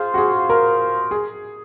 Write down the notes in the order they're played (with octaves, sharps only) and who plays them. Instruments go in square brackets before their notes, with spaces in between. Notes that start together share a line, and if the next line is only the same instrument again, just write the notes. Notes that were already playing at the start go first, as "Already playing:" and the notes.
Already playing: [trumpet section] F4 C5 F5 [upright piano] G#4
[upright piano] F#4
G#4
A#4
G#4